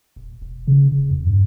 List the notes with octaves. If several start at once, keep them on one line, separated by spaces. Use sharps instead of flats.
D#1
E1
C#3
D#1
F2
G2